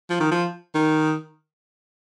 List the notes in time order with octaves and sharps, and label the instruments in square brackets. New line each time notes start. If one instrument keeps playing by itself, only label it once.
[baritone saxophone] F3
D#3
F3
D#3